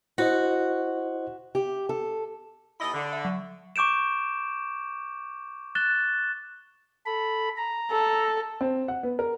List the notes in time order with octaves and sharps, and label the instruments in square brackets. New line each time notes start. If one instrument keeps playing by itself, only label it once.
[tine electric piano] E4 C5 D#5 [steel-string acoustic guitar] F#4
[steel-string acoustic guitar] G4
A4
[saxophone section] D#2 E4 D#5 [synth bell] B5 E6 A6
[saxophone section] D3
[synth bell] E5
F#3
[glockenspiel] C#6 D6 G6 D7 E7
F#6 A6 E7 G7
[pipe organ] A4 B5
A#5
[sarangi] A4
[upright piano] C4
F#5
B3
A#4